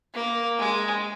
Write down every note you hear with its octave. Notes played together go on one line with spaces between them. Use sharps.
A#3
G#3